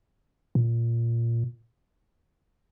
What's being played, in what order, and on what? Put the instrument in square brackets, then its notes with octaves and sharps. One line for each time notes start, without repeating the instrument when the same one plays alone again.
[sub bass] A#2